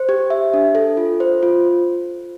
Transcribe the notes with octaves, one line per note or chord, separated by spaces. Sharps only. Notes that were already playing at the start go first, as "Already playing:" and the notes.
Already playing: C5
G4
E5
D4
A4
F4
C5
F4